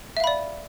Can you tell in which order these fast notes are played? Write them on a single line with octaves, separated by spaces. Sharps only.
E5 F5 B5 D5